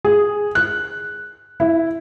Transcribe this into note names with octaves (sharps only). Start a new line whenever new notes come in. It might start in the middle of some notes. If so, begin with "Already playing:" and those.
G#4
F#6
E4